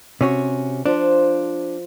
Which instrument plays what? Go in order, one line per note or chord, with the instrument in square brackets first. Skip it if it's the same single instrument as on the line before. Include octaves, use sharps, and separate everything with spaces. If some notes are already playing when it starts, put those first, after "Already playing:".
[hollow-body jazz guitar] C3 C#4 F#4
[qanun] F3 C5 [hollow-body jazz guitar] D4